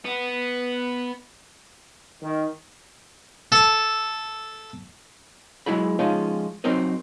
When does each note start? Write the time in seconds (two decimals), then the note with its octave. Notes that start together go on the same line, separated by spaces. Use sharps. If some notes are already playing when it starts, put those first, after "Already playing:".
0.05 B3
2.22 D#3
3.52 A4
5.66 F#3 G#3 E4 G#4 B5
5.99 F3 G#3 C#4 D#4 F4
6.64 F#3 C4 D#4 A#4 D#5